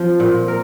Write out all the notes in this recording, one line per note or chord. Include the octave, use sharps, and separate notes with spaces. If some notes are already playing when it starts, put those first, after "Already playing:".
Already playing: F3 C4
A#2
A#4